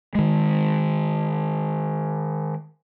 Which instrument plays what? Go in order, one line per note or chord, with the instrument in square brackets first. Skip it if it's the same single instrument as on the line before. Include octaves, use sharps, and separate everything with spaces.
[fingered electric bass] D#3 G#3